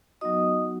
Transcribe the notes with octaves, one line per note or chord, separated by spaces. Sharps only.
F#3 B3 D#4 F#4 D#5 D#6